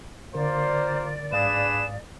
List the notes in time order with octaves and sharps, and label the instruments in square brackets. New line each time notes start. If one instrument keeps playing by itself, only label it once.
[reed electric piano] D3 A#4 [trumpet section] A#3 F4 C5 [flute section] D5
[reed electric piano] G#2 F5 D#6 [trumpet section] D4 G#4 B4 [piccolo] E7